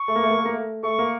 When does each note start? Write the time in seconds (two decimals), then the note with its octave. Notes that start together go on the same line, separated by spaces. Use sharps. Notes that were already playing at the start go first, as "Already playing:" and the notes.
Already playing: C#6
0.08 A3
0.16 A#3
0.23 A3
0.31 A#3
0.38 A3
0.45 A#3
0.53 A3
0.83 A3 C#6
0.99 A#3